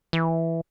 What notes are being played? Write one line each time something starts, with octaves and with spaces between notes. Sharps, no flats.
E3